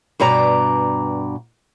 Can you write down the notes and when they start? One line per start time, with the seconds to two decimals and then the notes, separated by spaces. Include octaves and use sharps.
0.20 G2 B2 D5 A#5